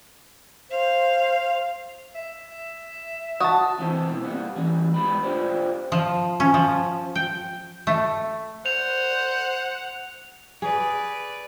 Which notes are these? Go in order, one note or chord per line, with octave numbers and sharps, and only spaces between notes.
C5 F5
E5
F#4 A5 D#6
E3 C4 E5
B2 E4
G3 A#3 F#5
E3 G3 C#4
G#2 G3 B3 B4 B5
D4 F4 G4 C5 D5
F3
C#4
F3
G5
A3
C5 F#5 F7
G#4 B4 D5